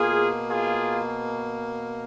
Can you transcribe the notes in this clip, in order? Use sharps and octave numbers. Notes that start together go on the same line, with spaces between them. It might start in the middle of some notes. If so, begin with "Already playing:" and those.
Already playing: B2 A#3 F4 G#4
F4 G#4